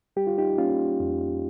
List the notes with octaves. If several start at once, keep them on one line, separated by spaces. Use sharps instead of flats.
G3 G4
F4
D#4 G4
A#3 C#4 F4
F2